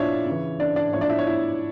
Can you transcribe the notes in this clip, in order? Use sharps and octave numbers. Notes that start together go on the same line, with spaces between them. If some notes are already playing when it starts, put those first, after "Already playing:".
Already playing: A#2 F3 D4 E4 F4 C#5 D5 E5
C#3 E3
D4 D5
D4 D5
A2 F3 C#5
D4 D5
E4 E5
C#5
E4 E5